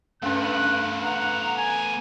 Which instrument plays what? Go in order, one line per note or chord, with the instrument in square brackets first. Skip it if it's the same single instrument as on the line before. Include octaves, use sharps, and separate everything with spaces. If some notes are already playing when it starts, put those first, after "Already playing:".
[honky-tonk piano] C#2 G2 [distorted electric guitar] A3 B3 [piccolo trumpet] F#6
[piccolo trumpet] F#5 [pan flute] A#5
[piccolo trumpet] G#5